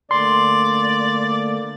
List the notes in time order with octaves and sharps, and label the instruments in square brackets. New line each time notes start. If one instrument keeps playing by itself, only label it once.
[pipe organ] D3 A3 A#3 [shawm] D5 [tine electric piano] C6